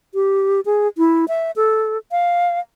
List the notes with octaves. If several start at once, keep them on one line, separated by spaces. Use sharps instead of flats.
G4
G#4
E4
E5
A4
F5